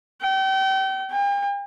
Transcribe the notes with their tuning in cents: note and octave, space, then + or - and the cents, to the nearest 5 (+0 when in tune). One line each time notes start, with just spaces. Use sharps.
G5 -35
G5 +45